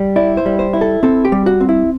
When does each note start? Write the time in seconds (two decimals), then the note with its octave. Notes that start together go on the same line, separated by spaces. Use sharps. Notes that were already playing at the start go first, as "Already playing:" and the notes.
Already playing: G3
0.16 E4 D5
0.37 C5
0.46 G3
0.59 C5
0.73 E4
0.81 A4
1.03 C4 A4
1.25 G4
1.32 G3
1.46 F#4
1.60 C4
1.69 E4